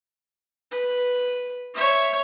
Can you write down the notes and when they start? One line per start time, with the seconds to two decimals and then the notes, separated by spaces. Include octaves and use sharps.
0.71 B4
1.74 C#5 E5